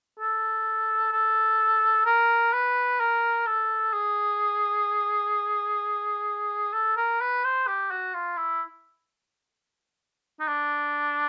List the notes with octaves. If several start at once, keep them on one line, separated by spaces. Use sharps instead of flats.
A4
A4
A#4
B4
A#4
A4
G#4
A4
A#4
B4
C5
G4
F#4
F4
E4
D#4
D4